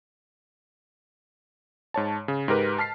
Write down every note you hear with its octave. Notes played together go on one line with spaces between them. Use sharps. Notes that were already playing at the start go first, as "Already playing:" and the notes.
G#2 C#5 A5
C#3
G#2 G4 A#4 B4
A5 F6 B6 C7